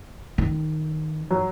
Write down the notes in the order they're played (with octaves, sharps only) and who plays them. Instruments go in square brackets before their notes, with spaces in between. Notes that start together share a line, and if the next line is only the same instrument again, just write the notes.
[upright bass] D#3
[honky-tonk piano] F#3